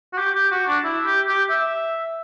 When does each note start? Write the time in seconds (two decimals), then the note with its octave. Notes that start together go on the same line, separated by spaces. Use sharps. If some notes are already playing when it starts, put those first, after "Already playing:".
0.13 F#4
0.18 G4
0.35 G4
0.51 F#4
0.67 D4
0.84 E4
1.06 G4
1.28 G4
1.50 E5